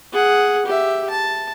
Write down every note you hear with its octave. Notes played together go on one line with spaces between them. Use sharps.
G#4 F#5
G4 E5
A5